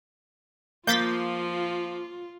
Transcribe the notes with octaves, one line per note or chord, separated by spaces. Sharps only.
F3 A#3 F4 G6 A6 B6